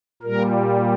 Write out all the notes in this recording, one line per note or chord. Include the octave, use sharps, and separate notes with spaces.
A#2 G3 A#4